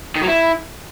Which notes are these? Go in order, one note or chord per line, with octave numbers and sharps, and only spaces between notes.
D#3
F#3
E4